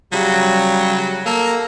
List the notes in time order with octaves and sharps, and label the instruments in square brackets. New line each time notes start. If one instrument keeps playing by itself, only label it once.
[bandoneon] C#3 G3 [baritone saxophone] F#3
[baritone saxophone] A#3 [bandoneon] A4 A#5